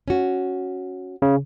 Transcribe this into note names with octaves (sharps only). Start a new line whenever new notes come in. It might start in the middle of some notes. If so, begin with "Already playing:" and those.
C#4 F#4
C#3